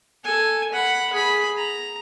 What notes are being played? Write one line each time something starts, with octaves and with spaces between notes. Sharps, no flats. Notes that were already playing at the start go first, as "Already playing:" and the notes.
A4 G#5
F#5 B5
G#4 B5
A#5